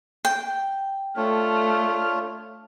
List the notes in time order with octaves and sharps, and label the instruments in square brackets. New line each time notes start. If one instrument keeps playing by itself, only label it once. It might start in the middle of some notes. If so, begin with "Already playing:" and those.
[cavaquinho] G5
[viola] A3 [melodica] D4 F4 C#5 [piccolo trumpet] F6